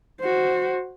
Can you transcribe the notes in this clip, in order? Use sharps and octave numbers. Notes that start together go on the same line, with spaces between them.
F#4 C5